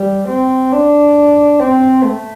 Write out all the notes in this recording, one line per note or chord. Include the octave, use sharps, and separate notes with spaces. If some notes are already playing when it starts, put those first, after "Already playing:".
Already playing: G3
C4
D4
C4
A3